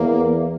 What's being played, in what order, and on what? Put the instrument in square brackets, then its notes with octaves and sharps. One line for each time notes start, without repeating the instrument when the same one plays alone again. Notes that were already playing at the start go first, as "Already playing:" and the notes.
Already playing: [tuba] E2 [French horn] A#3